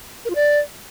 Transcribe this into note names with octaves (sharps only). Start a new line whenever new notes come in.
A#4
F4
D5